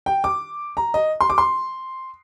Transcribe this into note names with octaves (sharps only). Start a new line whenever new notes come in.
G5
D6
A#5
D#5
C6
D6
C6